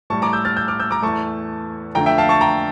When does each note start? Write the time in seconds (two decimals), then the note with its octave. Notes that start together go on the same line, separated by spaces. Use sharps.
0.10 A2 G3 A5 C#6
0.22 A#5 D6
0.33 E6 G6
0.45 F6 A6
0.56 E6 G6
0.68 D6 F6
0.80 E6 G6
0.91 A#5 D6
1.02 E2 E3 A3 A5 C#6
1.95 F2 D3 A3 G5 A#5
2.06 E5 G5
2.18 F5 A5
2.29 A5 C#6
2.41 G5 A#5